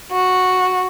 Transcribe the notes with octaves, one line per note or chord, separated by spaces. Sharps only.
F#4